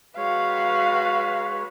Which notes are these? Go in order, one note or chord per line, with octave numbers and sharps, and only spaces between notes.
G#3 F#4 B4 C#5 F5